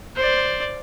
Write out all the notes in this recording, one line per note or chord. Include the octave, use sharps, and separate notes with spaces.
C5 D5